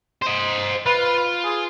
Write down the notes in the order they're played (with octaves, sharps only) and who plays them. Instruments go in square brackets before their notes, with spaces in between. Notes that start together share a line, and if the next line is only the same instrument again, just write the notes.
[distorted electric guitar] C5 D#5
[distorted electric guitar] F4 [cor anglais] B4
[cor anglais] G#4